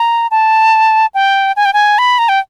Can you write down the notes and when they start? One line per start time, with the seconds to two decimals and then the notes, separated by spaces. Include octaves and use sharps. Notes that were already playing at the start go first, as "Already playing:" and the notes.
Already playing: A#5
0.31 A5
1.14 G5
1.56 G#5
1.65 G5
1.73 G#5
1.98 B5
2.18 A#5
2.29 G5